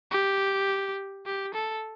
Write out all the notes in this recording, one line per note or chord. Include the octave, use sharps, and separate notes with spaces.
G4
G4
A4